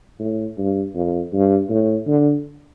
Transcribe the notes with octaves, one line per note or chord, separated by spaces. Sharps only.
A2
G2
F2
G2
A2
D3